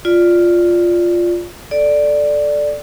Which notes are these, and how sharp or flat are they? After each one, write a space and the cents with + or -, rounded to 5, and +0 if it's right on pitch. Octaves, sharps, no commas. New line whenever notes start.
F4 +0 D5 +0
A4 +0 D5 +0